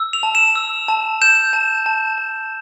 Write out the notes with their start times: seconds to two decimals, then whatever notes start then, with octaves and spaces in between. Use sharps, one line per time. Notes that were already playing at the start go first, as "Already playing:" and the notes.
Already playing: E6
0.13 F7
0.23 A5
0.35 E7
0.55 E6
0.88 A5
1.22 G6 E7
1.53 A5
1.86 A5
2.18 A5